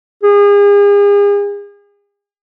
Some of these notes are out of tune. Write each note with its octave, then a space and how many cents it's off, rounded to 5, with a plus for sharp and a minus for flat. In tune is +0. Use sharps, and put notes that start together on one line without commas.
G#4 -40